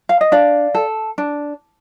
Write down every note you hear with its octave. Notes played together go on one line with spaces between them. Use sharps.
F5
D#5
D4 D5 F5
A4
D4